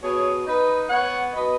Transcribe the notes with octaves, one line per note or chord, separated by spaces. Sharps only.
B2 G#4 C#5
D#4 B4 D#5
B3 C#5 F#5
B2 B4 D#5